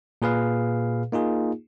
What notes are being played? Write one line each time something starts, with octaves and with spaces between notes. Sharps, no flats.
A#2 G#4 B4 F5
A#3 D#4 F4 G#4